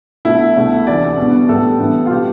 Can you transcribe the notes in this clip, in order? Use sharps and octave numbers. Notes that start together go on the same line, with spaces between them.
C2 B2 A3 E4
C2 B2 A3
D2 C3 E3 A3 D5
B2 G3 B3
A2 G3 B3 A4
A2 E3 B3
F4
B2 G3 B3 G4